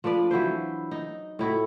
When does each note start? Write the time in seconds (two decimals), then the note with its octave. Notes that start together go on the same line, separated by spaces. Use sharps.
0.04 F3 D4 B4 D5
0.31 E3 F#3 E4 C5
0.91 D#4
1.39 A2 E4 F#4